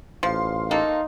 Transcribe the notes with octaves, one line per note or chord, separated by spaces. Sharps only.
A1 F3 F5 C6
A#3 D#4 A4